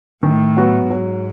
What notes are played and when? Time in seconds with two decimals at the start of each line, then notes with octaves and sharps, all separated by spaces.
0.23 A2 D#3
0.57 F#3 B3 F#4
0.89 G#2 F#3